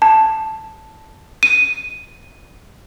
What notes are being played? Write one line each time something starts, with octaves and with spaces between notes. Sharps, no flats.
A5
D#7